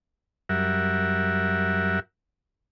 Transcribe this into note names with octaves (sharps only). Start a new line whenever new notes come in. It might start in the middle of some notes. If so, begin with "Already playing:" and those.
F#2 G3 A#4 E5 F#5